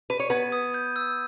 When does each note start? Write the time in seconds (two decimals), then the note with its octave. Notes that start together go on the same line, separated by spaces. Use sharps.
0.10 B4 D#7
0.20 C#5
0.30 B3 B4 G#6
0.52 D#6
0.74 G6
0.96 E6